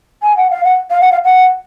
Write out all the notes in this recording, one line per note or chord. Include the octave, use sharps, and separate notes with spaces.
G#5
F#5
F5
F#5
F5
F#5
F5
F#5